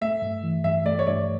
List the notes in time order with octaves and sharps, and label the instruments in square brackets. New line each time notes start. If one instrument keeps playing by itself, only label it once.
[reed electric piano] A3 [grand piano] E5
[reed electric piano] G2
E3
[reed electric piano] G2 [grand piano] E5
[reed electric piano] A3 [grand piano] D5
[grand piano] C#5
[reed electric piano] G2 [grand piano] D5